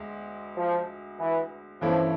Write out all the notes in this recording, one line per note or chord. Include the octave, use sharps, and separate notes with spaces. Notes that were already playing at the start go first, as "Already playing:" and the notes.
Already playing: D2 G#3
F3
E3
G2 E3 F3 A3 C#4 E4